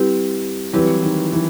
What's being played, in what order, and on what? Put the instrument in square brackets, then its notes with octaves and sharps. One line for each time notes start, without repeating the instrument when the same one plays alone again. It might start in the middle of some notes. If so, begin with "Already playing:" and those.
Already playing: [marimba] G3 C4 E4 G4 B4
[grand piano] E3 F#3 [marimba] G3 C4 E4 G4 B4
[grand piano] D#3
E3